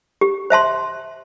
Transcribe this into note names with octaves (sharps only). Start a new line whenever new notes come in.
G4
C5 E5 A5 C6